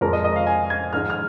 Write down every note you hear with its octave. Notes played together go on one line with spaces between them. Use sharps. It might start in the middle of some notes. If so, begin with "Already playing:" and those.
F2 F3 G#3 A#4
D#5
D#5
F5
G#5
G#6
G#2 F3 G#3 D#4 F6
F6